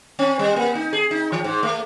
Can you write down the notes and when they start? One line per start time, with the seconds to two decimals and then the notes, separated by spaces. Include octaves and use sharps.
0.19 C4
0.39 G3
0.56 A#3
0.75 D#4
0.93 G#4
1.11 D#4
1.32 E3
1.44 G#2
1.63 A3